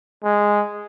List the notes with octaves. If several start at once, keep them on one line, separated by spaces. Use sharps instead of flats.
G#3